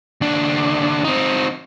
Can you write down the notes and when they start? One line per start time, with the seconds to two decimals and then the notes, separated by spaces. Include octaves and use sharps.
0.21 D#2 D4
1.04 C4 D#4